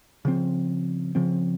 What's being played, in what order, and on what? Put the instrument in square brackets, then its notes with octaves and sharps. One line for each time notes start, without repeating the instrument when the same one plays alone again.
[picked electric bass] C#3 F3 C4
C#3 F3 C4